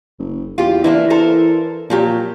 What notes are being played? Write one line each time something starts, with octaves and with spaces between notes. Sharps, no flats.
F#1
E2 F4 G4
E3 A#3 D4 E4
A4 A#4 C5
A#2 F3 F#3 G4